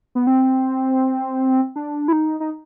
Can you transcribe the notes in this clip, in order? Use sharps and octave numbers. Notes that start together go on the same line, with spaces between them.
B3
C4
D4
E4
D#4
D#4